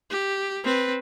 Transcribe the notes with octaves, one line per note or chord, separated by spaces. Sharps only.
G4
C4 B4